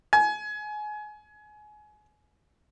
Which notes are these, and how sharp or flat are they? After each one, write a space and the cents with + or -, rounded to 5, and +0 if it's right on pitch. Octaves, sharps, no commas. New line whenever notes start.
G#5 +25